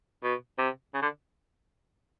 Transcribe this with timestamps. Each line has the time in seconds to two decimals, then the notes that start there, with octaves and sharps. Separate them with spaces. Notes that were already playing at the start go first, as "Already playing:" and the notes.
0.24 B2
0.58 C3
0.94 C#3
1.02 D3